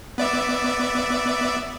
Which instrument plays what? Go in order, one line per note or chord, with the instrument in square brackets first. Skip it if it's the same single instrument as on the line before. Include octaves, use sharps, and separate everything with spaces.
[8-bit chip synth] B3 D5 E5